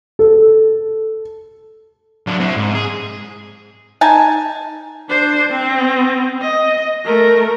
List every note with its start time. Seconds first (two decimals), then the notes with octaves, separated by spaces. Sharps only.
0.19 A4
2.27 F#3 D4
2.40 C4 E4
2.57 G#2
2.75 G#4
4.01 D#4 G#5 A5
5.09 D4 C5
5.50 C4
6.41 D#5
7.05 A3 A#4